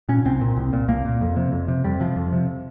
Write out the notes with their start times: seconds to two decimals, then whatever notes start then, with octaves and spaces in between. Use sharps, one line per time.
0.09 A#2 C#4
0.25 C2 C4
0.41 A#2
0.57 C2
0.73 A#2
0.88 C2 A#3
1.05 A#2
1.21 F2
1.36 C3
1.52 F2
1.68 C3
1.84 F2 G3
2.00 C3 F3
2.16 F2
2.33 C3